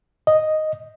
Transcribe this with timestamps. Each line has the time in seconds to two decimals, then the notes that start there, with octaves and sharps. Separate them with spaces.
0.27 D#5